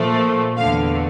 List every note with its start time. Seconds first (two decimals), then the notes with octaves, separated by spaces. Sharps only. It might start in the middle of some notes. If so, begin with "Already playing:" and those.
Already playing: A#2 F3 A3
0.56 E2 D3 A3 F5